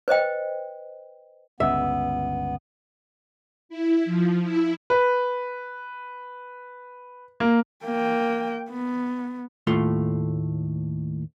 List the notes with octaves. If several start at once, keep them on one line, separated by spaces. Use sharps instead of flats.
B4 C5 D#5 G5
G1 C#2 C#3 B3 E5
E4
F3
E4
B4
A#3
A#3 G5
B3
D#2 A2 A3 F4 C6